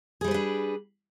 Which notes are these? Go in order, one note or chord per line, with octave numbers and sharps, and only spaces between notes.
G3 D4 G#4 B4 C5